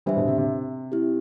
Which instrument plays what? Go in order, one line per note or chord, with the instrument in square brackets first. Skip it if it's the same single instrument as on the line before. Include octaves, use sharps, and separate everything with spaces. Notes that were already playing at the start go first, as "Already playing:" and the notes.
[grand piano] E3 G3 [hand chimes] D4 G4 C5 E5
[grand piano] B2 D3
C3
C3
[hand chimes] C4 E4 G4